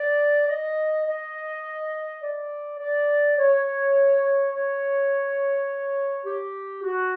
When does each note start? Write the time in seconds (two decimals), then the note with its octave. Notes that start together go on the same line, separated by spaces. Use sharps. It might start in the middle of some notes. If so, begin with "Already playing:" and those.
Already playing: D5
0.49 D#5
1.06 D#5
2.22 D5
2.79 D5
3.37 C#5
4.53 C#5
6.25 G4
6.83 F#4